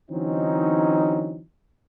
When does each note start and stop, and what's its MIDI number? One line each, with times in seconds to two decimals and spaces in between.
0.11 1.40 50
0.11 1.40 52
0.11 1.40 54
0.11 1.40 60
0.11 1.40 61
0.11 1.40 63